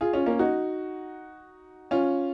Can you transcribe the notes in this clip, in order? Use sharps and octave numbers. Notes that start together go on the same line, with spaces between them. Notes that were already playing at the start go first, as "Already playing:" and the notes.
F4 G#4
C#4 F4
A#3 C#4
D#4 F#4
C#4 F4